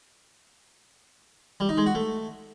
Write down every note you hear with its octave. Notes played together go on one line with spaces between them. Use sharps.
G3
D#4
G#3
F#4
A3